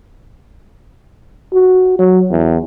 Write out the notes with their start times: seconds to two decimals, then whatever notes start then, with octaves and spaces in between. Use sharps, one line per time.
1.53 F#4
1.99 F#3
2.31 E2